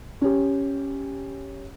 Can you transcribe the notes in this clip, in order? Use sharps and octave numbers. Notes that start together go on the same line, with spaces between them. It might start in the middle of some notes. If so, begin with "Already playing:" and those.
C#4 G4